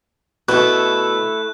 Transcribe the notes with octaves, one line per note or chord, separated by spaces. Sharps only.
B2 A3 E4 F#6